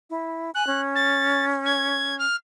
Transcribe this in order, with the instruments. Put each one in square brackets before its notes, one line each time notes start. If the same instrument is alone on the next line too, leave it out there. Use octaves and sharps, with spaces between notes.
[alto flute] E4
[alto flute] G#5 [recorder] F#6
[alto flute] C#4
[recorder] A6
G#6
F6